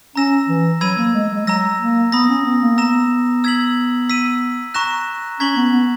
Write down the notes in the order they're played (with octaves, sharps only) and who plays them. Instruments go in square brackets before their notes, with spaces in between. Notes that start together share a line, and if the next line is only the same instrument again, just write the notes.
[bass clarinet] C#4 [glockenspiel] A#5 E6 A#6 E7
[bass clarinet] E3
[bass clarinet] F#3 [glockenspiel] B5 E6 G#6 D#7
[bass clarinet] A#3
G#3
G#3
[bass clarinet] F#3 [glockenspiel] A#5 E6 A#6
[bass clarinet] A#3
[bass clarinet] B3 [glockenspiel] B5 D#6 A#6
[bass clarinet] C#4
B3
A#3
[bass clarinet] B3 [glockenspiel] A#5 E6 A#6 E7
[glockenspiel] E6 G#6 B6 F#7
E6 B6 D#7
A#5 C#6 F#6 A#6 E7
[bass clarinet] C#4 [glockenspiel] A#5 C#6 G#6 B6 F#7
[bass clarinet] B3
B3